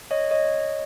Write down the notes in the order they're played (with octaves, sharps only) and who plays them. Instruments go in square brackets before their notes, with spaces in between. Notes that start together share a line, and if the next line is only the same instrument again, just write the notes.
[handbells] C#5 D#5
C#5 D#5